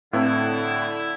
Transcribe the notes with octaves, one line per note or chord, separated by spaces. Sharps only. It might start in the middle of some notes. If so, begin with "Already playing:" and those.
A2 D3 C4 E4 B4 F5